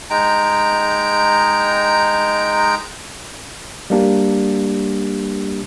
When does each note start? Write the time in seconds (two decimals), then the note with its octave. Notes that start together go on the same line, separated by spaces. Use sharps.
0.10 G#3 D#4 G5 A#5
3.90 G3 A#3 D4 G4